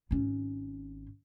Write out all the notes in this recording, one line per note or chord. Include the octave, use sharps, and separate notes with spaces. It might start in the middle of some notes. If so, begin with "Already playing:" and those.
G#1 C#4